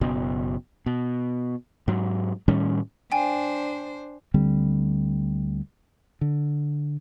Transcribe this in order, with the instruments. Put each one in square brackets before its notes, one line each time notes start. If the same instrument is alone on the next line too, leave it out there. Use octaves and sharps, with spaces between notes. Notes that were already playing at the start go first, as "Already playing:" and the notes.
[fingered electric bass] F#1 B2
B2
G#2 F#3
A2 D#3 G3 C#4
[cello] D4 C5 [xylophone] G5 G#5
[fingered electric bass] D2 D3 G3 C4
D3